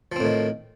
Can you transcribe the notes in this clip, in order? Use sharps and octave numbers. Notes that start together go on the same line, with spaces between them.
A2 D#3 F3 C4